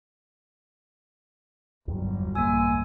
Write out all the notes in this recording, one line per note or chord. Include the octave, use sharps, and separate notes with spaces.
G1 E2 G2 F#3
A#1 E2 A#3 G#5 E6